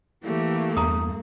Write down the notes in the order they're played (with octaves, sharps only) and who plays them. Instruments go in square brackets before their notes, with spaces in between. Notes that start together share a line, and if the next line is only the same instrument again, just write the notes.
[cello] E3 G4 [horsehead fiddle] A3 A#3
[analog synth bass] E2 [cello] G2 [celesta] A#5 D#6